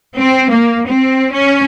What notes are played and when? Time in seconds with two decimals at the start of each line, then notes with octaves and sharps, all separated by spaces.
0.20 C4
0.51 A#3
0.89 C4
1.35 C#4